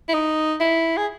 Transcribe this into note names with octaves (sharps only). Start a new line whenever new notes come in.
E4
D#4
E4
G#4